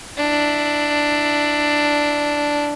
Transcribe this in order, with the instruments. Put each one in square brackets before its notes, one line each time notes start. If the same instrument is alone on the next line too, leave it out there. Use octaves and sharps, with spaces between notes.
[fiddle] D4 E4